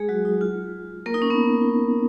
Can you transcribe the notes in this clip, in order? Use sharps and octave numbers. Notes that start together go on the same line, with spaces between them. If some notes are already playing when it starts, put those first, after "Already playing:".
Already playing: G#3 G#4
F#3 F#4
D#4
F4
A#3 A#4
D#4
C#4
B3